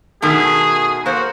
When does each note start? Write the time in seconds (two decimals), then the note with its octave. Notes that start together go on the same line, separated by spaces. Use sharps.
0.22 B2 D#3 A3 G#4
1.06 A#3 F#4 A#4 C5